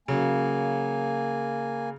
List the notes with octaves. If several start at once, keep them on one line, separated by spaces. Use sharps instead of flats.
C#3 F#3 A#3 G#5